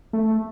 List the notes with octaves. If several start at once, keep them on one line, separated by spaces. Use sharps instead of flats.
A3